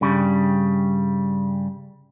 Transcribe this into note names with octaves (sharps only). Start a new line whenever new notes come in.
G2 C#3 G3